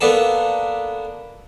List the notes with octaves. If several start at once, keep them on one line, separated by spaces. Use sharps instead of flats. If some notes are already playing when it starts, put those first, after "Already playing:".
A#3 B3 D4 A4